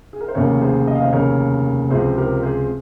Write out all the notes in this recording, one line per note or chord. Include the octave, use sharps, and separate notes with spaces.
G#4
A#4
C5
F1 D#2 C#3 A#4 C#5
G#4 C5
D#5
F5
C5 D#5
F1 D#2 C#3 A#4 C#5
C#2 C3 F3 C4 G#4 C5
G4 A#4
G#4 C5